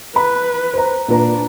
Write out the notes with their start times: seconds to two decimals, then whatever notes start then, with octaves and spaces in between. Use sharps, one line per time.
0.16 B4 B5
0.74 C5 A#5
1.08 A#2 D4 B4 A#5